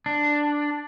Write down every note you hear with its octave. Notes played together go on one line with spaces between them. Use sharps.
D4